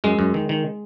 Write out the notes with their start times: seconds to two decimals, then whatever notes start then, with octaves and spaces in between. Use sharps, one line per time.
0.04 F#2 G#3
0.19 F#2
0.34 D#3
0.49 D#3